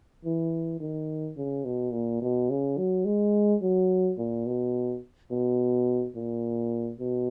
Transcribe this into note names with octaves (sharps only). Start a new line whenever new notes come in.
E3
D#3
C#3
B2
A#2
B2
C#3
F#3
G#3
F#3
A#2
B2
B2
A#2
B2